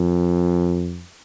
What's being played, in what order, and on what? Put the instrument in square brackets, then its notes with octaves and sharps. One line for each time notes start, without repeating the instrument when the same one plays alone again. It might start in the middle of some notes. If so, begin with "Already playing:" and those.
Already playing: [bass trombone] F2